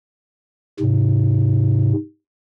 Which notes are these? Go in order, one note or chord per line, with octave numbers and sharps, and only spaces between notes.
G#2 C3